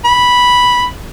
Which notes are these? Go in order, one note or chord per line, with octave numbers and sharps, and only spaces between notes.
B5